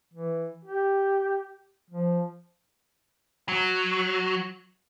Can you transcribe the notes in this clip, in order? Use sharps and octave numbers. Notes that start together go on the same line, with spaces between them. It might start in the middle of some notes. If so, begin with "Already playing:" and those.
E3
G4
F3
F#3